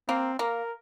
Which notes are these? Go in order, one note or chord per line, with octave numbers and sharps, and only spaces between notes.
A#3 C4
A#3 A#4